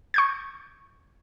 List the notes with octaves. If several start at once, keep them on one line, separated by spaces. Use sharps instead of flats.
C#6 G6 G#6